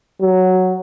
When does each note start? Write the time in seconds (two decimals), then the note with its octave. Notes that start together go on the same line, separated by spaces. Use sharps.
0.21 F#3